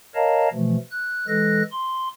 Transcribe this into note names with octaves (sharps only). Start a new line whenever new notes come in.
A#4 C#5 D#5 F5 A5 A#5
B2 E3 F3 A3
F#6
E3 G#3 A4 F#6 A#6
C6